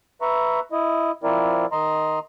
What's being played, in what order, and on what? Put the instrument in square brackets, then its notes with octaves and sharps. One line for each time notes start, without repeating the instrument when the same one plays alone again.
[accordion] B4 E5 A#5 C#6
E4 D#5
F3 C4 E4 A#4 D5
D#3 D#5 A#5 C6